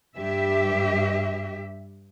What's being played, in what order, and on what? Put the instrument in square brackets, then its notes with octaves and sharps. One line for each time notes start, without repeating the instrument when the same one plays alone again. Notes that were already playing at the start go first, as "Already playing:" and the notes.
[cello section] G2 G4 E5